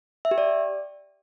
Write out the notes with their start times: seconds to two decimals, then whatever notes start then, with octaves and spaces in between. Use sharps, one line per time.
0.25 E5
0.31 G4
0.38 D5